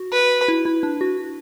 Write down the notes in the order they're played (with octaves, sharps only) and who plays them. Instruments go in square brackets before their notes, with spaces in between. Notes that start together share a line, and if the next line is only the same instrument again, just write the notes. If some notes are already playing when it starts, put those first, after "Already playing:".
Already playing: [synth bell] F#4
[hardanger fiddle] B4
[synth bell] E4
E4
D4
F#4